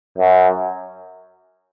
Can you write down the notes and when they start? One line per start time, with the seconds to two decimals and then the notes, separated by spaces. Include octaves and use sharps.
0.18 F#2